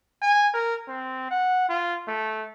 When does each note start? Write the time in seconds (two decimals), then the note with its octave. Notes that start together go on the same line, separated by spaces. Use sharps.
0.22 G#5
0.54 A#4
0.88 C4
1.31 F#5
1.69 F4
2.07 A3